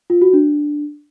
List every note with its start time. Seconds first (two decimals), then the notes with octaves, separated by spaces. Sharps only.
0.10 F4
0.22 F#4
0.33 D4